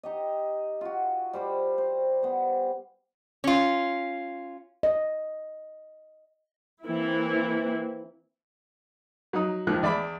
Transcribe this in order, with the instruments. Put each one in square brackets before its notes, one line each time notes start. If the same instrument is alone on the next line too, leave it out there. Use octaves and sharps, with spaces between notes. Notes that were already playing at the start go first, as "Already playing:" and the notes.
[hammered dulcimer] D#4 G4 D#5
F4 F#4
G3 C5 B5 D6
C5
B3 C5
[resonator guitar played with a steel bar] C#4 F4
[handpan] D#5
[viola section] E3 A#3 C4 E4
[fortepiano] F#3 D#4 D#6
D#2 D#3 F3 F#6
E2 D5 E5 B5 D6